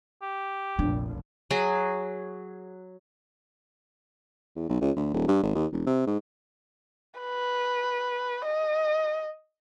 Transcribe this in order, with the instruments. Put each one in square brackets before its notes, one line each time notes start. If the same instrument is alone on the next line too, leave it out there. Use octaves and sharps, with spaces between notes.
[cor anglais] G4
[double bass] F1 A#1 [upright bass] D4
[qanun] F#3 F#4 G#4
[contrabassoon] E2
B1
C#2
D2
D#1
G2
G#1
D#2
E1
C3
G#2
[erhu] B4
D#5